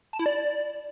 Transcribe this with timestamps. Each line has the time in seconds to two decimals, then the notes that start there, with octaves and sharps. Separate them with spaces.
0.13 A5
0.19 E4
0.26 D5